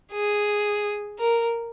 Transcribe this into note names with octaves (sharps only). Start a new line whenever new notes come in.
G#4
A#4